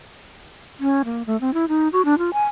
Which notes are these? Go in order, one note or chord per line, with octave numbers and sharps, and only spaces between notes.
C#4
A#3
A3
C4
E4
D#4
F#4
D4
F4
G#5